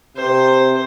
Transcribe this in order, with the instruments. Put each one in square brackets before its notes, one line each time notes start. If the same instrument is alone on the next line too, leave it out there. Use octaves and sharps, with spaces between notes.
[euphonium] C3 [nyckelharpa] C5